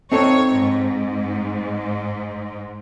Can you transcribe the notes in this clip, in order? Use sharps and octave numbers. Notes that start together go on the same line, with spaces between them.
C4 D#4 A4 C#5
G#2